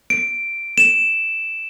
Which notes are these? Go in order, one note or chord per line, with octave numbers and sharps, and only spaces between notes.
D7
E7